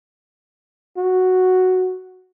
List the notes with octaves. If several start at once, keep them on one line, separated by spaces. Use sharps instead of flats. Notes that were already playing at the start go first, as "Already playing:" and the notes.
F#4